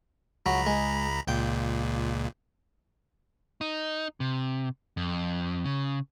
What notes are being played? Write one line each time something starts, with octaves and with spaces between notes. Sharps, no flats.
C#2 F#3 A#5 B5
G#3
C#2 A#2 G5
D#4
C3
F2
C#3